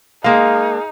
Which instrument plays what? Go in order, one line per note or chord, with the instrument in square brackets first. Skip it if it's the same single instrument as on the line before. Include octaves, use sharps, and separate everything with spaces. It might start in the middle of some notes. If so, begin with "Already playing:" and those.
[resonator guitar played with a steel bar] G#3 A#3 [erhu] D#4 [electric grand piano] G#4 F5